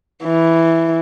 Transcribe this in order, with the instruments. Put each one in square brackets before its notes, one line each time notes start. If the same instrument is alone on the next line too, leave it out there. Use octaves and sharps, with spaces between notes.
[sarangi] E3